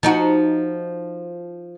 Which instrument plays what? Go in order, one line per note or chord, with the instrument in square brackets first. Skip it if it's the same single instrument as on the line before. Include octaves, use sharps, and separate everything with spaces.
[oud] F3 D#4 F#4